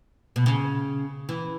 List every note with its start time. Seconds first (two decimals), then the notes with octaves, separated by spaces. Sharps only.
0.36 B2
0.46 C#3
1.29 E3